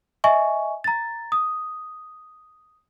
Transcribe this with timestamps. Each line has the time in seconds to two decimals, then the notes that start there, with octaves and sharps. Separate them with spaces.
0.24 D#5 E5 G#5 C#6
0.84 A#5 A6
1.32 D#6